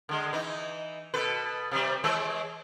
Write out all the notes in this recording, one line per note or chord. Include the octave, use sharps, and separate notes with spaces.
D3 G#3
E3 D#4
B2 A4 B4
C3 G3
E3 G#3 C#5